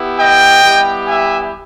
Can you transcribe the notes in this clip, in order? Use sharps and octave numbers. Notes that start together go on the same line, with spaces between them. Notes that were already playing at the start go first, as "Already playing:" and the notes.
Already playing: B3 E4 G4
D#5 G5
G3 B3 E4 G4
E5 G#5